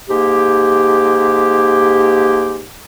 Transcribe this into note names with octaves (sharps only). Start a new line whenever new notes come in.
G#2 A#3 G4